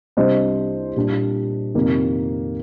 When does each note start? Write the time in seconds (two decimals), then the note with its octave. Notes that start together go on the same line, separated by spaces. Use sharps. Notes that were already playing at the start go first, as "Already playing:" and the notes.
0.17 C2 C3 G3 D4 C5 D#5
0.96 A#2 G3 D4
1.75 F2 C3 D#3 A#3